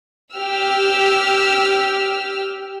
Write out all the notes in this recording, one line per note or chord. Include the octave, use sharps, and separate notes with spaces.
G4 E6 F6